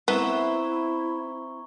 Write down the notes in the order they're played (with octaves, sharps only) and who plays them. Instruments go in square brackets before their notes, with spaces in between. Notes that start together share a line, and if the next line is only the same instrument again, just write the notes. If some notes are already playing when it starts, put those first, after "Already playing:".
[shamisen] B3 [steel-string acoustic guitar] C4 E5 [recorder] E4 [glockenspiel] A#5 C#6 G7